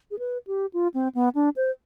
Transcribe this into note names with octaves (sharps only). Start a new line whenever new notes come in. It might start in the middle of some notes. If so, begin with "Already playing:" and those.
G#4
B4
G4
F4
C4
B3
D4
C5